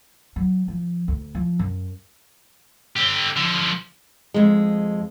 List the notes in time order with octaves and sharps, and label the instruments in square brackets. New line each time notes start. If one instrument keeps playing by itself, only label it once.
[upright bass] F#3
F3
D2
F3
F#2
[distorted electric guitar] D3 G4
D3 F3
[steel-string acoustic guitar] F2 G#3